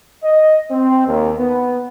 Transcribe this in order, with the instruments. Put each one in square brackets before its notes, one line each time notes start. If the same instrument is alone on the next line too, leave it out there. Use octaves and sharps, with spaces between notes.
[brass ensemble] D#5
C4
D#2
B3